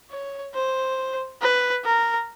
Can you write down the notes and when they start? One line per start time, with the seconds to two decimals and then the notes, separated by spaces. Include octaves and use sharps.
0.11 C#5
0.54 C5
1.42 B4
1.85 A#4